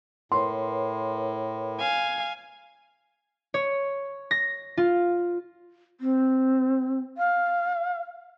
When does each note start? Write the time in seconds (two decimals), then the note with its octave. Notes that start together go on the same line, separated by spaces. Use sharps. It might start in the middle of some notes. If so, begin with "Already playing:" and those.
0.32 A2 A#4 B4 C#5 C6
1.79 F5 G#5
3.54 C#5
4.31 A#6
4.77 F4
6.00 C4
7.17 F5